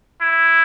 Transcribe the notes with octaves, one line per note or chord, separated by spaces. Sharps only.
E4